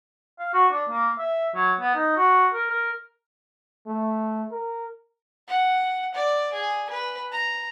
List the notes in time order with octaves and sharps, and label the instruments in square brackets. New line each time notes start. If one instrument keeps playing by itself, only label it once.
[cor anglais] F5
F#4
D4
A#3
E5
F#3
B3
D#4
F#4
A#4
A#4
[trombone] A3
A#4
[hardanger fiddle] F#5
D5
G#4
B4
A#5